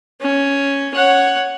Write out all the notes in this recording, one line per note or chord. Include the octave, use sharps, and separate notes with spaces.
C#4
C#5 F#5